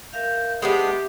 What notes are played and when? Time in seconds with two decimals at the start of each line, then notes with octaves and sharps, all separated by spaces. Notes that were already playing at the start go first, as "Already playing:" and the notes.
0.13 A#4 E5 F5 G6
0.62 G#3 B3 D4 G4 G#4 E5